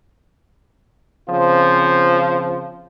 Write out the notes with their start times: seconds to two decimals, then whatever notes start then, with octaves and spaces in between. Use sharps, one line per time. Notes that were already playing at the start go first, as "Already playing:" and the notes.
1.28 C#3 F3 C4 F4